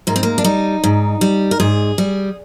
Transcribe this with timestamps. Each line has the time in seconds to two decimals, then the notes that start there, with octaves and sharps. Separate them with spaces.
0.07 G#2 A#3
0.16 C4
0.23 A#3
0.38 D4
0.44 G3 D#4
0.84 G#2
1.21 G3
1.51 A#4
1.60 G#2 G#4
1.98 G3